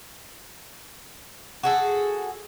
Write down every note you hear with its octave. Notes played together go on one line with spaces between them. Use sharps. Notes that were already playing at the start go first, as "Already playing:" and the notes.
F#4 G#4 A4